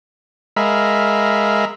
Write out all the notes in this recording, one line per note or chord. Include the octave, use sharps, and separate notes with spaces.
G#3 A#4 E5 F5 B5